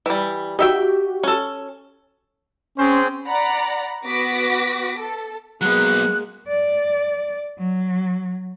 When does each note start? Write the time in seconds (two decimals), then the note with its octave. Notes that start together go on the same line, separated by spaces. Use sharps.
0.06 E3 G3
0.59 D#4 F#4 G4 E5 G5
1.23 C#4 A4
2.78 C4 C#4 G#4 C5
3.26 D5 F#5 A#5 B5
4.05 B3 F#4 D6 A#6 B6
4.98 A4
5.61 F#3 G#3 A#3 B3 F#6
6.48 D5
7.58 F#3